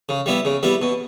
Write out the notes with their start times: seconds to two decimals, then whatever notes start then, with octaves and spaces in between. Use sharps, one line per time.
0.09 C#3
0.26 G3 B3 E4
0.45 C#3
0.63 G3 B3 E4
0.82 B2